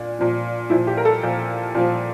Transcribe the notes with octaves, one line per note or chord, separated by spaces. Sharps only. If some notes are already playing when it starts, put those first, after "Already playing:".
Already playing: A#2 D4
A#2 F3
A#2 F3 E4
G4
A#4
A4
A#2 F3
A#2 F3